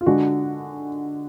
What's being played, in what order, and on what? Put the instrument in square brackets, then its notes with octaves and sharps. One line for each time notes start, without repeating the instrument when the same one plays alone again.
[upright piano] F4
D3 G#3 D4 F#4